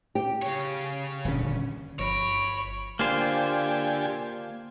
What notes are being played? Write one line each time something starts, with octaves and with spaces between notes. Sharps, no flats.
G4
C#3 C#5
D#1 D3 C#4
G1 F3 C#5 B5 A#6 D7
D3 A#3 F4 G4 C5 G#5